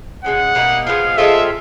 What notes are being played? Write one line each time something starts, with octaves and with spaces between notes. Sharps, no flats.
B2 G#3 C#4 F#5
B2 G3 A#3 D#4
F3 G#3 B3 F5
G#3 C4 F4 A4 E5